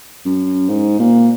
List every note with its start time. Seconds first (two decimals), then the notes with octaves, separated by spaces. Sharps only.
0.26 F#2
0.69 G#2
0.99 A#2